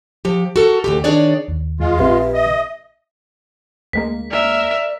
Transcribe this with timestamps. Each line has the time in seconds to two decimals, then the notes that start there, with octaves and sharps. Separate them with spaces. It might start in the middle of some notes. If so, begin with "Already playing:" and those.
0.25 F3 G4
0.56 F#4 A4 A#4
0.84 D2 E3 G4
1.04 D#3 D4 G#4 C#5 D5
1.48 D#2
1.80 E2 G#3 F4
1.99 A#1 C4 G4 B4 E5
2.34 D#5
3.93 D2 G#3 A#3 B6
4.31 A#4 D5 E5